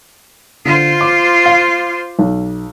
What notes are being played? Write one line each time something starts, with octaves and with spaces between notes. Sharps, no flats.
D3 F4 C5 D#7
D6
F5
B1